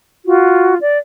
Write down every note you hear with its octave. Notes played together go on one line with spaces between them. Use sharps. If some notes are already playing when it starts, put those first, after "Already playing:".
F4 F#4
D5